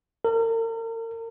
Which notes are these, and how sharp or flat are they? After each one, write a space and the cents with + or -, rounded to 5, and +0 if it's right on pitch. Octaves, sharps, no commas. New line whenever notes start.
A#4 -40